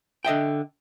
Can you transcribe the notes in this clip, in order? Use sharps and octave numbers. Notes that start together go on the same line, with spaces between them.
D3 D#5 E5 G5